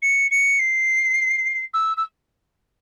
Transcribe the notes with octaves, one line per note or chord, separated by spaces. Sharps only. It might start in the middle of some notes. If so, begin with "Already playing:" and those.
C#7
C#7
C7
E6
E6